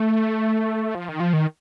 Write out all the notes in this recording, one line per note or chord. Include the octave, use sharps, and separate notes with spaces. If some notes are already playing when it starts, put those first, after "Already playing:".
Already playing: A3
F3
D#3
F3
D#3